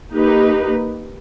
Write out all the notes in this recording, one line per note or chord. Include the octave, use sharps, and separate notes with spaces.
A#3 D#4 G4 B4